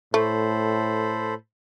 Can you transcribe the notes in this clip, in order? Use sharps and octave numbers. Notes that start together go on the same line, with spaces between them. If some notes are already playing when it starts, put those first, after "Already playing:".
A2 A3 A4 C5 B5